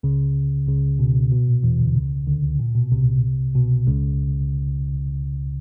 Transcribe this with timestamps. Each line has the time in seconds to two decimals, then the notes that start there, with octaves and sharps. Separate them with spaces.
0.03 C#2 C#3
0.68 C#2 C#3
0.99 B2
1.16 B2
1.32 B2
1.48 A#2
1.64 E2 E3
1.79 D2 D3
1.95 C#2 C#3
2.27 D2 D3
2.59 A#2
2.75 B2
2.92 C2 C3
3.56 B2
3.87 C#2 C#3